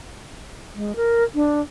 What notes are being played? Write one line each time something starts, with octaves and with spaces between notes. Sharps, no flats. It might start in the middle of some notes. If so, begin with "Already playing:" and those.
G#3
A#4
D4